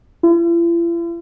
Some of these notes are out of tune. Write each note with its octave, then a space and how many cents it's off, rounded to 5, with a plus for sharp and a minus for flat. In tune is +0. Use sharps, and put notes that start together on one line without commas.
E4 +45